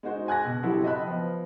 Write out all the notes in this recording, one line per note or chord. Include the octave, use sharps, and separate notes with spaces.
G#3 D#4 F#4 C5
F#5 G#5 F#6 G#6 A#6
B2
F#3 C4 E4 F#4 G4 A4
D#5 E5 G5 A5 B5 F#6
F3 B3